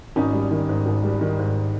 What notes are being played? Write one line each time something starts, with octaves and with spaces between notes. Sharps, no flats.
G#1 C#4 D#4
G3
D#3
G#2
G#1
G3
D#3
G#2